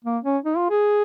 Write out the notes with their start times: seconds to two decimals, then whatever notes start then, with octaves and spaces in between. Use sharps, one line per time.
0.05 A#3
0.24 C#4
0.44 D#4
0.57 F4
0.70 G#4